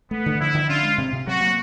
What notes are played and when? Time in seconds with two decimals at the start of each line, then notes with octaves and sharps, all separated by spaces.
0.11 A3 B3
0.26 D3
0.40 F3 E4
0.54 D3
0.69 C#4 F4
0.83 G#3
0.98 C3
1.13 C3
1.27 F#3 F#4
1.41 A#3